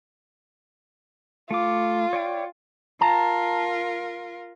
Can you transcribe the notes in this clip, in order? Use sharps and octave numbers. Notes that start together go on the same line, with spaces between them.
A3 F4 D6
C#5 D5 G5
F4 A#4 A5 A#5